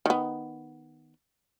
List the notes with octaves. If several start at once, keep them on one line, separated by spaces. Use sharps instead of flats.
D#3 B3